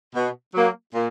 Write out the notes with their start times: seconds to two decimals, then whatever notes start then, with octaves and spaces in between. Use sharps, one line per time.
0.14 B2
0.54 F#3 A#3
0.93 A#2